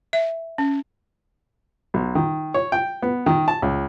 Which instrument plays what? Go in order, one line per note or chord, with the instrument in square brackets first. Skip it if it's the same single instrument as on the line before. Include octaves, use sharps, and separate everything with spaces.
[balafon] E5
C#4
[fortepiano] B1
D#3
C#5
G5
B3
D#3
A5
C#2